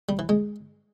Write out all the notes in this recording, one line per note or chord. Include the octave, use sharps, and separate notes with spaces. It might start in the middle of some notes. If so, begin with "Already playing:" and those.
G3
E3
G#3